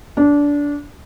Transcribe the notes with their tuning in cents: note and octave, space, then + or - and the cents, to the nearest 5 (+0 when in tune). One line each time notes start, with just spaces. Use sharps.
D4 -20